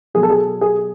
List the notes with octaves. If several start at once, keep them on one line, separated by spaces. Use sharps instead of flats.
B2 F#3 G#4
A4
G#4
G#4